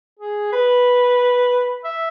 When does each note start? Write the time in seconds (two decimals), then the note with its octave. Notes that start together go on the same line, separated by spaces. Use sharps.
0.20 G#4
0.52 B4
1.85 E5